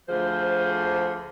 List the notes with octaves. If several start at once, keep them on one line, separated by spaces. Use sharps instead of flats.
D2 F3 G#4 C5